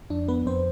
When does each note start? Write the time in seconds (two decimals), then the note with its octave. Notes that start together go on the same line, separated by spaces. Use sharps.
0.10 F2 D4
0.28 B3 B4
0.46 F2 C4 C5